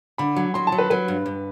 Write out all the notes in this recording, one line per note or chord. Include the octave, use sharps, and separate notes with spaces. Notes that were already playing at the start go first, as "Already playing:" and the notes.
D3 B5
F#3
F#3 C6
A5
F#3
B4
F#3 B4
G2
G2